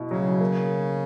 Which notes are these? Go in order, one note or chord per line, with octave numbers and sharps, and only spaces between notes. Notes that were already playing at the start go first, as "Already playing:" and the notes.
Already playing: B2 E4
C#3 F#3
A#3